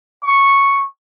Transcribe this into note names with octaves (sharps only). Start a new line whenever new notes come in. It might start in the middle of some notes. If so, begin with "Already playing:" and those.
C#6